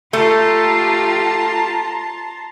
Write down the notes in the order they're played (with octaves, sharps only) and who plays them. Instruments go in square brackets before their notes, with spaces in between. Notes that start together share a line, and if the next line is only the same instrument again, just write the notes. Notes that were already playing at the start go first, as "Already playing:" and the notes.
[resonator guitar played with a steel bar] A3 [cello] F4 G4 [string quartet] A5 A#5 C6